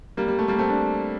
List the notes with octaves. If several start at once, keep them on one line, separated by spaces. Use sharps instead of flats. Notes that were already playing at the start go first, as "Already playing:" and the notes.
G3 A#3
G3
A3
G3 A#3
A3 C4
D4